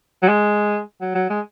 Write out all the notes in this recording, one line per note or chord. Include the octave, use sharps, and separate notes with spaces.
F#3
G#3
F#3
F#3
G#3